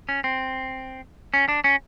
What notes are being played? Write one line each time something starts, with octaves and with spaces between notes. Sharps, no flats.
C#4
C4
C#4
D4
C#4